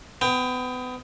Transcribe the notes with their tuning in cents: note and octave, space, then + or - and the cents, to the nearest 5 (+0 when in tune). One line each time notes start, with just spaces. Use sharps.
B3 +30 G5 +15